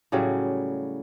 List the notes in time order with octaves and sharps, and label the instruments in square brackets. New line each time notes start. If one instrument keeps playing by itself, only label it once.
[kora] A2 C#3 F#3 G3